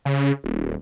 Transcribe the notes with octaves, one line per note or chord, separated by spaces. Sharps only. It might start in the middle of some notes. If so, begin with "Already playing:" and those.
C#3
D#1